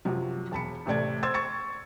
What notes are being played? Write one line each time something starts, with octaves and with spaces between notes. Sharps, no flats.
F#2 C3 F3 F#3
E1 A5 B5 C#7
A1 C3 A3 D5 G#6
C5 C6 E6 G#6 A6
C#6 A6 C#7